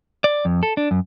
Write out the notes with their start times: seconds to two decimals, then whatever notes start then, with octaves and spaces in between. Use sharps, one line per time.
0.24 D5
0.45 F2
0.63 A4
0.77 D4
0.91 F#2